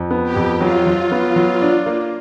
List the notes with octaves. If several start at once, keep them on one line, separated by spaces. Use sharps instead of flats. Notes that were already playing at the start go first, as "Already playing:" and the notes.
Already playing: F2
B3
G4
F2
F#3 F4
F#3
B3
F#3
D4
A#3